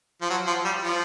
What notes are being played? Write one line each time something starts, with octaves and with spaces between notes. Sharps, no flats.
F3
F#3
F3
G3
F3